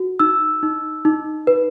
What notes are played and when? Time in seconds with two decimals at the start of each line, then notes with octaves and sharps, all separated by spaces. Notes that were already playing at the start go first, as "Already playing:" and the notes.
Already playing: F#4
0.19 D#4 E6
0.63 D#4
1.05 D#4
1.47 B4